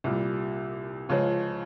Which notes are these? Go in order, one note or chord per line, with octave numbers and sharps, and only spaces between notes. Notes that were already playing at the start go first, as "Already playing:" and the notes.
C2 A#2 G3
C#2 C#3 F3 G#3 C#4